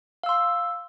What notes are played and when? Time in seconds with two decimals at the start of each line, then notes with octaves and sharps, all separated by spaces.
0.23 F5
0.26 E6
0.29 C6